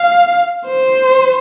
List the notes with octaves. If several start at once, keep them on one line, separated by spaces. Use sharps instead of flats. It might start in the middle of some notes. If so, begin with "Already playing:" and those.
Already playing: F5
C5